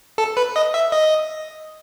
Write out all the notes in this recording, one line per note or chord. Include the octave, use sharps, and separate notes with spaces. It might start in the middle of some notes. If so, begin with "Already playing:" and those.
A4
B4
D#5
E5
D#5